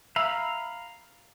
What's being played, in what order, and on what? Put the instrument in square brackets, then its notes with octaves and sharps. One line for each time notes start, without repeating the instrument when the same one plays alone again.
[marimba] E5 E6 [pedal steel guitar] F5 A#5 B5